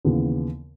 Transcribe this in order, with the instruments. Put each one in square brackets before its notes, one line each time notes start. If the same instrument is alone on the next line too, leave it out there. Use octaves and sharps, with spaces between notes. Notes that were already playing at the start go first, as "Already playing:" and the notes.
[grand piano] D#2 C#3 E3 B3